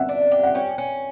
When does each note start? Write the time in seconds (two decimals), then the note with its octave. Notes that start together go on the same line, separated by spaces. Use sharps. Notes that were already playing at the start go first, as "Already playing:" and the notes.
Already playing: E5 F#5
0.09 D4
0.32 G4
0.43 F#5
0.54 C#4 G5
0.78 C#4